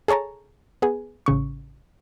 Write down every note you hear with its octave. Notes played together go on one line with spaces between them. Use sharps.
G#4 A4 C#5 A5 A#5
B3 G#4
A1 C#3 C#6